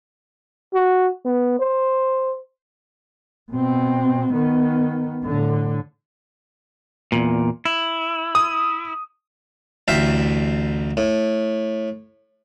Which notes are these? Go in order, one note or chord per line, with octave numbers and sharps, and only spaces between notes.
F#4
B3
C5
B2 C4
D#3 B3
A2 D3
E2 A#2
E4
D#6
A1 D2 E5 F5 G5
A2